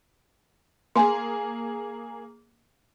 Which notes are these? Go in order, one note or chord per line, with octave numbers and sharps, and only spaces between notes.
A#3 G#4 G#5 C6